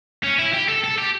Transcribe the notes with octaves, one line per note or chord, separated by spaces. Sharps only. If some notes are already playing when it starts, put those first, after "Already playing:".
C#4
E4
G4
A4
A4
G4